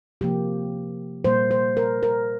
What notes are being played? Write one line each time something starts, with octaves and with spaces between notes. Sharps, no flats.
C3 F3 A#3 G4
A#2 G3 A#3 C5
C5
A#4
A#4